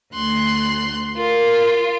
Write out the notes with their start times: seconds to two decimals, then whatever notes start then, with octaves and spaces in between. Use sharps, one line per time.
0.13 D2 C6 F#6
1.17 F4 A#4